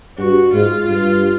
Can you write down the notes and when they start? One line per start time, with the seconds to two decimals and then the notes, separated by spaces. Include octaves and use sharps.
0.18 G2 F#4
0.54 G#2 F4
0.89 G2